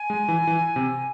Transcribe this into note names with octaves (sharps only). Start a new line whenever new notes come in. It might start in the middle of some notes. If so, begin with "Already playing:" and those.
Already playing: G#5
G#3
E3
E3
C3